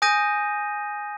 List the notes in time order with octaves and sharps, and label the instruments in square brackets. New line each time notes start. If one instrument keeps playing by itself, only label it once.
[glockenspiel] G#5 D#6 G6 A#6 D#7